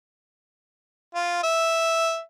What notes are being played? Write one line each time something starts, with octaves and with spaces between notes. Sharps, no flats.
F4
E5